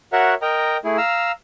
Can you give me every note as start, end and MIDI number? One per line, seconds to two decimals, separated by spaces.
0.13 0.34 66
0.13 0.34 70
0.13 0.34 73
0.13 0.34 76
0.13 0.34 78
0.42 0.77 70
0.42 0.77 75
0.42 0.77 79
0.42 0.77 82
0.85 0.97 57
0.85 0.97 64
0.85 0.97 68
0.98 1.32 77
0.98 1.32 82
0.98 1.32 88